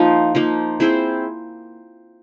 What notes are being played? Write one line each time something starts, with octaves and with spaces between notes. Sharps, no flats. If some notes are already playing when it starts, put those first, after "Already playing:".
Already playing: F3 A#3 D#4
F3 A#3 D#4
C4 E4 G#4 C5